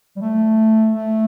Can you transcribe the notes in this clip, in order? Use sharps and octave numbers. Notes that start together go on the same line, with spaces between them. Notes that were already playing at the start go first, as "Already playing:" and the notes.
G3
A3
A3